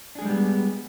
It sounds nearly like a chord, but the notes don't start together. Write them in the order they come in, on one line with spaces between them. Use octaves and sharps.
D4 G#4 G#3 G3 B3